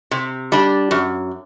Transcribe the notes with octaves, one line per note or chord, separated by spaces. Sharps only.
C3
G3 D4
F#2